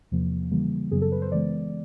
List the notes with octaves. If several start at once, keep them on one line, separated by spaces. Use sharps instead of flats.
E2 C3 F3 A#3
C#3 E3 G3 A#3
F#2 C#3 F#3 B3 G#4
A4
B4
C5
C#3 E3 G#3 B3 D5